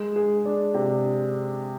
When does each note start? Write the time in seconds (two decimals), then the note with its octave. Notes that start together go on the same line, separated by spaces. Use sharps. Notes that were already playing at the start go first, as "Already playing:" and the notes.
Already playing: G#3
0.16 G#4
0.45 D4
0.74 C3